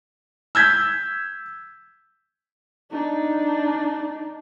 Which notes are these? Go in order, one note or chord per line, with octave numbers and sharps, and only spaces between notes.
E6 G6 G#6 B6
D4 D#4